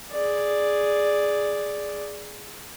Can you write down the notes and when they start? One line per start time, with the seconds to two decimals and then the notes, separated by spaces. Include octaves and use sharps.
0.11 G#4 D5